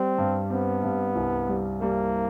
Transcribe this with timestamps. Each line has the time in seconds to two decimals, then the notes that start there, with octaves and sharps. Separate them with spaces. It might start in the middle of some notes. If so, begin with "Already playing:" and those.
Already playing: G3 C4
0.18 G2
0.50 B3 C4
0.83 G2
1.16 C2
1.49 G3
1.82 G3 A#3